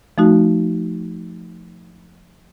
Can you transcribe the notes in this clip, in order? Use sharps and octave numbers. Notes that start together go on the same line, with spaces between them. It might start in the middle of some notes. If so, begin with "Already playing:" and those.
F3 A3 D#4 F#4